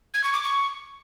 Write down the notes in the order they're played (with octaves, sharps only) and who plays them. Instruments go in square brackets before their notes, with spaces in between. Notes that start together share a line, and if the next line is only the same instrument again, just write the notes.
[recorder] G#6
C#6
D6
C#6